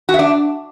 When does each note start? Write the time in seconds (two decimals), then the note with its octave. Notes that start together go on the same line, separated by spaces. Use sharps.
0.09 F#4
0.14 E5
0.19 D4